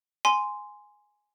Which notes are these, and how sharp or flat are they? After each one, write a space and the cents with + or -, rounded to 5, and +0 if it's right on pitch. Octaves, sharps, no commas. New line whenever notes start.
G#5 +0 C6 -10